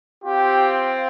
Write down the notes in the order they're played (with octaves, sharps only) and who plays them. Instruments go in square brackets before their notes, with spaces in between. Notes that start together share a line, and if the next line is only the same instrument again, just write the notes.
[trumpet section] C4 F4 G4